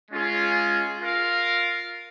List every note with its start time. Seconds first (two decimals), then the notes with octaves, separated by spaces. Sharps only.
0.10 G#3 C#4 F4 G#4
1.00 F4 A#4 F5